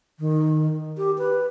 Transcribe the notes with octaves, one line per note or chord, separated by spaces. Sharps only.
D#3
G4
B4